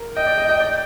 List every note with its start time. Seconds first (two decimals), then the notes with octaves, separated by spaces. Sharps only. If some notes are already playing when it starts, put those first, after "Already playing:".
Already playing: A#4
0.16 D#5 G5
0.26 D5
0.38 D#5
0.49 D#5
0.60 D5